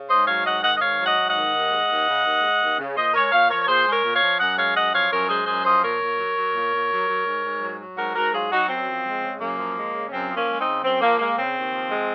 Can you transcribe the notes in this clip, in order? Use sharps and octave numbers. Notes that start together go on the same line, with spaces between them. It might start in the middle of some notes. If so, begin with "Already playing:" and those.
Already playing: C#3
G#2 C5 D#5
F#3 C#5 F5
G#2 D#5 F#5
D#3 D#5 F#5
D#5
G#2 C#5 F5
F#3
D#5 F#5
G#2
D#5 F#5
D#3
D#2
G#3
D#2
C#3
D#2
G#3
D#2
C#3
A#2 C5 D#5
G#3 A#4 C#5
A#2 C#5 F5
F3 A#4 C#5
C#5
A#2 G#4 C5
G#3
A#4 C#5
A#2
C#5 F5
F3
F#2 D#5 F#5
G#3 C#5 F5
F#2 D#5 F#5
F3 C#5 F5
F#2 A#4 C#5
G#3 G#4 C5
F#2 G#4 C5
F3 C5 D#5
A#2 A#4 C#5
A#2
F#3
F#3
A#2
A#2
F#3
F#3
G#2
G#2
F#3
F#3
G#2 F#4 A#4
G#2 F#4 A#4
F#3 F4 G#4
F#3 D#4 F#4
F#2 C4
F3
G#3
C#3
F#2 A#3
F3
G#3
C#3
C#4
F#2 C4
F3
A#3 C#4
G#3
C4 D#4
C#3
F#2 C4
F3 A#3
G#3 A#3
C#3 C4
D#2
F3
G#3